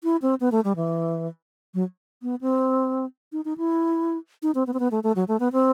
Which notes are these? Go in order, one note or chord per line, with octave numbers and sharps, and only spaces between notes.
E4
C4
B3
A3
G3
E3
F#3
B3
C4
D#4
D#4
E4
D#4
C4
B3
C4
B3
A3
A3
F#3
A3
B3
C4